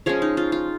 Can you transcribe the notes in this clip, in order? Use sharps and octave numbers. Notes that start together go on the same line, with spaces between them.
F3 G#3 C#4 G#4 C#5
D#4
F4
F4